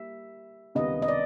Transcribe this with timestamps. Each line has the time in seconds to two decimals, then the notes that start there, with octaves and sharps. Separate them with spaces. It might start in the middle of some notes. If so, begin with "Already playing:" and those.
Already playing: G3 A#3 E5
0.75 C#2 C3 D#3 G3 B3 D#5
1.02 D#5
1.08 D5